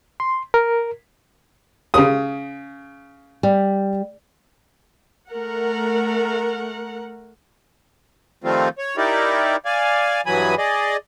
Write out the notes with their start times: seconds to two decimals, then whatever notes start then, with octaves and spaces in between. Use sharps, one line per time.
0.20 C6
0.54 A#4
1.94 C#3 D#6
3.43 G3
5.29 A3 A#4 F#5
8.44 D#3 F3 G3 A3 C4 F4
8.78 C#5
8.97 D#4 E4 G4 A#4 D5
9.65 D5 F5 G#5
10.26 G2 E3 F#3 G#5 B5 D#6
10.58 G#4 D5 D#5